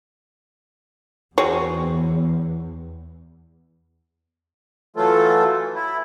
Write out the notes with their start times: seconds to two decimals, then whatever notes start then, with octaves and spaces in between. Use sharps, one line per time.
1.38 E2 C4 F#4 G#4 C#5
4.96 E3 F#3 A3 F4 A4
5.75 E4